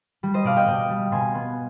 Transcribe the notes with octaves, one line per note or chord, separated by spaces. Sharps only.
G3
C5 D#5
B2 D5 F5
D#5 G5
B2
G3
B2 G#5 C6
B3